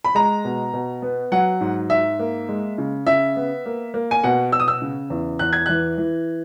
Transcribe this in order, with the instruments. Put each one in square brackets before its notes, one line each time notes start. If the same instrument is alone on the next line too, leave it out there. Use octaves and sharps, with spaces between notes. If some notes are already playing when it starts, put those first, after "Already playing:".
[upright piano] B5
G#3 A#5
B2
B2
B3
F#3 F#5
G#2
G#2 E5
A#3
G#3
C#3
C#3 E5
B3
A#3
A#3
G#5
B2 F#5
B2 E6
D#6
E6
C#3
E2
E2 F#6
G#6
E3 F#6
E3